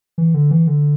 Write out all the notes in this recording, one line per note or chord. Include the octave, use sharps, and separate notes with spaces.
E3
D3
E3
D3